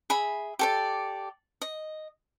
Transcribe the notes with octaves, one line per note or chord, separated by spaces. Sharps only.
G#4 E5 B5
G4 A4 D5
D#5